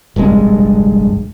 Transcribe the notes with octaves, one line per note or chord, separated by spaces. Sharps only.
F1 A#1 G2 G#3